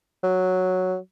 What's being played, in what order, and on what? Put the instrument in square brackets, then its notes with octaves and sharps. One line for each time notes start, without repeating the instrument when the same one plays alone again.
[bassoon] F#3